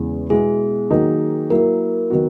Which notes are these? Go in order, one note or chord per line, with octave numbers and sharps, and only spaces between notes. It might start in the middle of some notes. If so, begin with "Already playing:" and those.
Already playing: E2 C#3 E3 G#3
B2 G#3 B3 E4 G#4
D#3 F#3 A#3 D#4
F#3 A#3 E4 A#4
D#3 F#3 B3 F#4